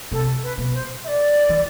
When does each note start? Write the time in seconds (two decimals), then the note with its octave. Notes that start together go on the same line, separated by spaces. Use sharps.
0.12 C3 A4
0.43 B4
0.58 B2
0.73 C5
1.03 E5
1.07 D5
1.49 E3